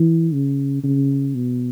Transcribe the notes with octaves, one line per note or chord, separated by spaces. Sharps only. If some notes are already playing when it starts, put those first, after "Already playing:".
Already playing: E3
C#3
C#3
B2